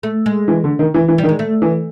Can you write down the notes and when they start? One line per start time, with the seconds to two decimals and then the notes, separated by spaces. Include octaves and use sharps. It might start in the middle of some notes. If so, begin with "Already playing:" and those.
0.03 A3
0.26 G#3
0.48 E3
0.64 D3
0.79 D#3
0.94 E3
1.08 E3
1.18 G3
1.23 D#3
1.29 G#3
1.39 A3
1.62 E3